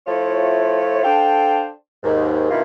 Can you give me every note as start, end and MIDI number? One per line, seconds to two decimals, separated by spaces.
0.07 1.01 53
0.07 1.01 57
0.07 1.01 64
0.07 1.01 65
0.07 1.01 73
1.03 1.69 62
1.03 1.69 69
1.03 1.69 72
1.03 1.69 77
1.03 1.69 79
2.04 2.49 39
2.04 2.49 44
2.50 2.62 43
2.50 2.62 47
2.50 2.62 51
2.50 2.62 58
2.50 2.62 64
2.50 2.62 65